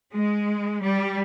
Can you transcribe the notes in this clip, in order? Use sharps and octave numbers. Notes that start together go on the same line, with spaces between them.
G#3
G3